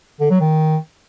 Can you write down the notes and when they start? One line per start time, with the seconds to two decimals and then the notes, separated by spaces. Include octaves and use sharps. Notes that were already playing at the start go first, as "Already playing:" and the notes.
0.20 D3
0.30 F#3
0.41 D#3